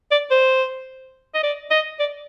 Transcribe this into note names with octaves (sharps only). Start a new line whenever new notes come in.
D5
C5
D#5
D5
D#5
D5